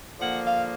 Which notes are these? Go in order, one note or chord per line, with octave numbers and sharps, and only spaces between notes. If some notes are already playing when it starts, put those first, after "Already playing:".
D3 F3 A#3 F#5
F5